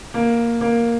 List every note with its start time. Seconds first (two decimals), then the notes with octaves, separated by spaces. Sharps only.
0.14 A#3
0.61 A#3